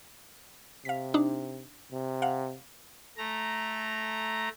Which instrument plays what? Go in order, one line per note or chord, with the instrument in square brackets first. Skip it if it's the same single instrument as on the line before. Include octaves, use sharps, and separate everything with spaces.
[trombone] C3 [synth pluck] F5 B6
[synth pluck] D4 D#4
[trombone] C3
[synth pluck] F5 F#5
[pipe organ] A3 A#5